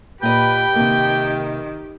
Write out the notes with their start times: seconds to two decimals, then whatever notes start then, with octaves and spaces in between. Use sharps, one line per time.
0.23 A#2 G4 B4 D#5 G5
0.75 C3 D#3 A#3